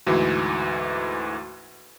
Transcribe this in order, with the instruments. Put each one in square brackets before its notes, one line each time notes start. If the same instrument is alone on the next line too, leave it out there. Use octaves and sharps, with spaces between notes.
[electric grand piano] D2 G#2 E3 [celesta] F#4